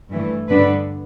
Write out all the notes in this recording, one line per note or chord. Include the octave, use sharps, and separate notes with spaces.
G2 E3 A3
G2 D3 B3 D4 B4